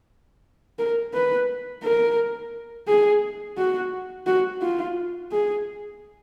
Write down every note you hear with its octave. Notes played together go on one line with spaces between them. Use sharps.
A#4
B4
A#4
G#4
F#4
F#4
F4
G#4